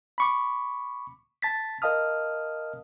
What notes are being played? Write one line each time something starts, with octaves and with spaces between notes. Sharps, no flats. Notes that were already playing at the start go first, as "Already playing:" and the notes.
B5 C#6 D6
A5 A6 B6
A#4 D#5 F5 A5 D#6 F6